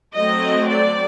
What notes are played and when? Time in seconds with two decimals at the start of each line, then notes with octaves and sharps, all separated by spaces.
0.16 F#3 A3 C4 D#5
0.70 D5